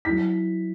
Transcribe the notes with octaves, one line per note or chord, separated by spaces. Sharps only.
F#3 E4 B6